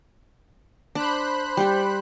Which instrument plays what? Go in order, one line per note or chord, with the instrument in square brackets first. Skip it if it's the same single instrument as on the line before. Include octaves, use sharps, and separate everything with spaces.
[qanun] D4 [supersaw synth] C5 B5 F#6
[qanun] G3 G4